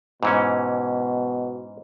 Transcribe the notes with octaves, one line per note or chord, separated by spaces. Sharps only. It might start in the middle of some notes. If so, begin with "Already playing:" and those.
G#2 B2 E3 C#4